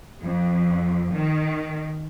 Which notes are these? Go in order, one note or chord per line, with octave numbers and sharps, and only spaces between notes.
F2
D#3